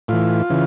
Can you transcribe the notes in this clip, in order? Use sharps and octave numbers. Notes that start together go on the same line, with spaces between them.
A2 E3 F4
C#3 E3